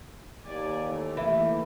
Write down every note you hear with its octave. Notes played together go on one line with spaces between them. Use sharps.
D#2 G4 D5 G#5
E3 A3
E3 A3 A#3 E4 G4